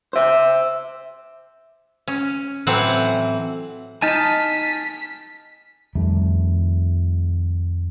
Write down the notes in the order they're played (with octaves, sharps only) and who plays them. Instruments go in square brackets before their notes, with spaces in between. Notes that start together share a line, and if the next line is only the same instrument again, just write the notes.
[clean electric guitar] C5 E5
[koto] C#4
A2 E3 F#3 C4 F#5
[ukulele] D#4 [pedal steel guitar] G#5 A5 F6 [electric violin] B6
[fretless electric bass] F2 D#3 G3 A3